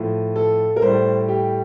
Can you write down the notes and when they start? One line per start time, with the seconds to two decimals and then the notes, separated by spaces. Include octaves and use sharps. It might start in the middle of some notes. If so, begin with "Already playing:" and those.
Already playing: A2 F3
0.36 A4
0.76 A#4
0.82 A2 G3 C5
1.28 G4